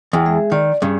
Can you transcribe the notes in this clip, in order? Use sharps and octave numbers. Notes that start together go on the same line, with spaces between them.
E2 G5
G#3 G#4 E5
D#3 D5
G2 C#3 G#4